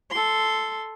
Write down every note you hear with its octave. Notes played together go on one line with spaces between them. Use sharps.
A4 C6